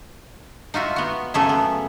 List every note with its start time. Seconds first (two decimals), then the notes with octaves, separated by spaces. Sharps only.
0.74 D#4 F4 F#4 E5
0.96 B3 F#4
1.34 F#2 C#3 A3 G#4 A4 E5
1.49 B3